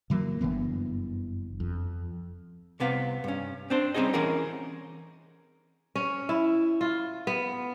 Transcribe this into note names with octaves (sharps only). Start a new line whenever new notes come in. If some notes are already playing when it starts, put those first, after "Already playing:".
C#3 E3 F#3 A#3
F#1 G2 E3 B3
F2
C2 C3 B3 F5
G2 C#4
C4 D4 C5
G3 C4 C#4 D#4 G#4 D#5
E3 C#4 G#4 A#4 F#5
C#4
E4
F4
B3